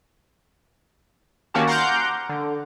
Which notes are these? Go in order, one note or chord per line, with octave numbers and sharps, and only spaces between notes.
D#3 A#3 C#4 F#4 G4 A5
F#5 A#5 C6 D6 F6 G6
D3